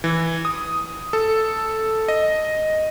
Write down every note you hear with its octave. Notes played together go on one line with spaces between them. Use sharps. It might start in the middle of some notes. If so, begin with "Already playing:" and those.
E3
D#6
A4
D#5